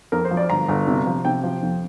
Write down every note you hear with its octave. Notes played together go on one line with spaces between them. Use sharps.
F2 A#4
C5
F3
D5
G1 A#5
G1
C3
F3
C3 G5
F3
F2